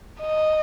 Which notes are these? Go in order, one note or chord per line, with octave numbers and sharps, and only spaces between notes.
D#5